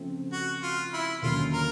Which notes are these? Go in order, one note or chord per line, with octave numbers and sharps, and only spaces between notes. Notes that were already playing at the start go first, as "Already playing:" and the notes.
Already playing: C#3 F3 A3 C4
F#4
F4
E4
D#2 D3 F#3 A#3 C#4 F4
A#4